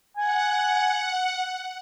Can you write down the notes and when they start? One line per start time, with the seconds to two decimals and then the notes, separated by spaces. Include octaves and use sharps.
0.17 F#5 G#5